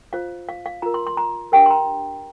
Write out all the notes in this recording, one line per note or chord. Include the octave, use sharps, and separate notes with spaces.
F4 C5 F5
F5
F5
F4 A#4 A#5
C6
C6
A#5
D4 G4 A#4 G5
C6
A#5